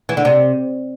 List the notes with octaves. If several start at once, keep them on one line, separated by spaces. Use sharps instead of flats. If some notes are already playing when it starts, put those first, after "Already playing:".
E3
D3
C3